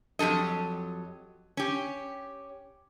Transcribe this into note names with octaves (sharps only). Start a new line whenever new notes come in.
F2 F#3 G4 A4 D#5
C#4 G4